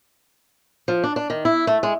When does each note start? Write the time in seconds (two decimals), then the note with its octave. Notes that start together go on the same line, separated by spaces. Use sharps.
0.88 F3
1.03 D4
1.16 D4
1.30 D#3
1.45 E4
1.67 A3
1.83 G#3